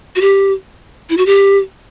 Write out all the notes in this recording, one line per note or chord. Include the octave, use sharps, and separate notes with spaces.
F#4
G4
E4
F#4
G4